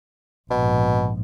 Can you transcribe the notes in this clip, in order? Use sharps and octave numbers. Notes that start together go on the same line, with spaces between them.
A#1 G#2 B2